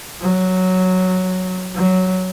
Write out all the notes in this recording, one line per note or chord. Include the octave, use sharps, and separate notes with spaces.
F#3
F#3